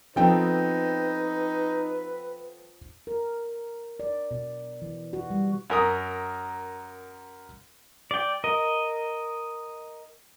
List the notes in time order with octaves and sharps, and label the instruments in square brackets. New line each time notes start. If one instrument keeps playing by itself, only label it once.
[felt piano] F3 G5 [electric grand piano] B3 C4 A4 [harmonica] D#4 [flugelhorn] B4
[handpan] A#4
D5
B2
E3
F#4
G3
[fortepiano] F#2 A#4 D#6
[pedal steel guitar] D5 G5
A#4 D#5